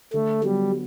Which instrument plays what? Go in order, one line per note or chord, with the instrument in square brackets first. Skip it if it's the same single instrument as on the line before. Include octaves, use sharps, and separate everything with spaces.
[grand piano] D3 [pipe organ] A3
[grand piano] F#3 B3 [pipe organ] G3